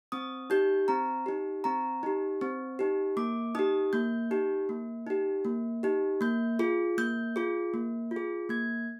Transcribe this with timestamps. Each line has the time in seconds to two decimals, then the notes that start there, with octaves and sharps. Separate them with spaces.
0.12 C4 D#6
0.50 D#4 G4 G6
0.88 C4 A#5
1.26 D#4 G4
1.64 C4 A#5
2.03 D#4 G4
2.41 C4
2.79 D#4 G4
3.17 A#3 D6
3.55 D#4 G4 D#6
3.93 A#3 G6
4.31 D#4 G4
4.69 A#3
5.07 D#4 G4
5.45 A#3
5.83 D#4 G4
6.21 A#3 G6
6.59 F4 G#4
6.98 A#3 G6
7.36 F4 G#4
7.74 A#3
8.11 F4
8.16 G#4
8.49 A#3 G#6